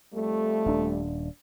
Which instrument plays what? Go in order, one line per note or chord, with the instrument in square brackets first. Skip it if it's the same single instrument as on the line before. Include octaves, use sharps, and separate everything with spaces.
[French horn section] F2 G3 A3
[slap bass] D#1 D4